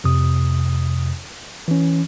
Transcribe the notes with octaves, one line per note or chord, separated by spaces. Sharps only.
F2 C3 D#6
E3 C#4